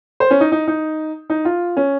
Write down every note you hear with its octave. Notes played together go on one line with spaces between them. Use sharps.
C5
C#4
D#4
D#4
D#4
D#4
F4
C#4